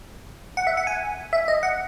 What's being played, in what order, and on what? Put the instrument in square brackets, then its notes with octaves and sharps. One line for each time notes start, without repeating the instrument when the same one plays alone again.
[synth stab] F#5
E5
F#5
G#5
E5
D#5
F#5